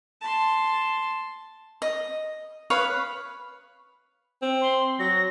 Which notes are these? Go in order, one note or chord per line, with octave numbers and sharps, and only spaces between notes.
A5 C6
D#5
B4 C#5 F5 D#6
C4
C6
F#3 A#6